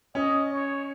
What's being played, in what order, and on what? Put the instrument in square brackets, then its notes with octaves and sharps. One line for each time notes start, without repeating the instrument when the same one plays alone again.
[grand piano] C#4 [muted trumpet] D#5
[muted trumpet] C#5